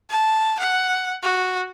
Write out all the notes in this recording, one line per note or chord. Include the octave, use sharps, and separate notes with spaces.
A5
F#5
F#4